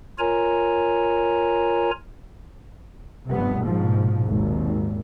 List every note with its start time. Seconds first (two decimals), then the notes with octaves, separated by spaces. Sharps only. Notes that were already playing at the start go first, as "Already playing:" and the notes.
0.19 F4 A#4 C#5 G#5 A#5
3.29 F1 G2 C3 B3
3.64 A#1 G#2 B2 F3
4.27 G#1 D#2